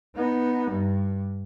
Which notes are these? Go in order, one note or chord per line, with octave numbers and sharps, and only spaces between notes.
B3 D#4
G2